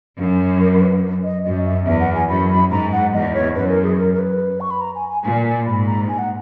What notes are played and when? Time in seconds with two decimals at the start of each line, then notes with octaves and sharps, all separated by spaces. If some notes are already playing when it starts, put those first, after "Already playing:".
0.18 F#2
0.60 A#4
0.72 A#4
0.81 B4
1.24 D#5
1.44 F#2 D#5
1.65 E5
1.87 E2 E5
2.00 F#5
2.15 G#5
2.29 F#2 B5
2.50 B5
2.71 G#2 A#5
2.92 F#5
3.13 E2 D#5
3.34 C#5
3.55 F#2 B4
3.70 A#4
3.83 G#4
3.98 A#4
4.14 A#4
4.19 B4
4.61 C#6
4.71 B5
4.81 A#5
4.95 G#5
5.09 G#5
5.24 A#2 G#5
5.45 G#5
5.66 G#2 B5
5.86 A#5
6.09 G#5
6.19 F#5